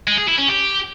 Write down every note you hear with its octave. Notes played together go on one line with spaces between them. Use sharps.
G#3
G#4
E4
C#4
G4